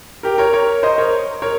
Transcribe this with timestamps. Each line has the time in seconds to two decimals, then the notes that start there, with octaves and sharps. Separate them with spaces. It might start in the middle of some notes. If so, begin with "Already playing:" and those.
0.23 G4 A#4
0.38 A#4 C#5
0.53 A#4 C#5
0.83 C5 D#5
0.98 A#4 C#5
1.42 A#4 C#5